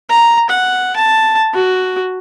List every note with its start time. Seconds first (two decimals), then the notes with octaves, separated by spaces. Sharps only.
0.10 A#5
0.50 F#5
0.96 A5
1.54 F#4